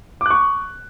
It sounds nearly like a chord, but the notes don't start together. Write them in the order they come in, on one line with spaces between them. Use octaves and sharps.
D6 F#6 C#6